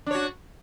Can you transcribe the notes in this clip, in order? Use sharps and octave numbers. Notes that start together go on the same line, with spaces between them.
D4 F#4 C#5